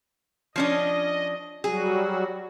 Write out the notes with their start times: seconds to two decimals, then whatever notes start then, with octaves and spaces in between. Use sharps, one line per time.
0.56 F3 C#4 D4 D#5
1.64 F#3 G3 F#4 G#4